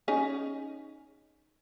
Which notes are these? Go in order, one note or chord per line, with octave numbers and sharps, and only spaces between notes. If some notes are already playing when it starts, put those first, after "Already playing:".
C#4 D#4 G#4